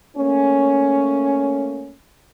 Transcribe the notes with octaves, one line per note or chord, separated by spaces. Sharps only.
A3 A#3 C#4